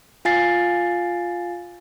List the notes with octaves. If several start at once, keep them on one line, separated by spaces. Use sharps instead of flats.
F4 F5 G#5 A6 C7